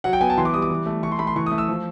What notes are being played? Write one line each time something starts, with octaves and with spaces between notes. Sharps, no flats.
F#3 F#5
G5
B3 G#5
A5
E3 C6
D6
G3 D#6
D6
E3
A3
E3 C#6
C6
A3 B5
C6
E3 C#6
D#6
A3
E6
F3